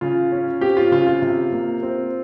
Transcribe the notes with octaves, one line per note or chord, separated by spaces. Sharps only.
C#3 F4
C#4
C4 G4
F4
C#3 F4
F4
C3
A#3
C4